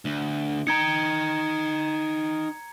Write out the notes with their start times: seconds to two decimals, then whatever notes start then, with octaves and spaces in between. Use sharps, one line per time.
0.05 D2
0.67 D#4 G5 A#5 G#6 C#7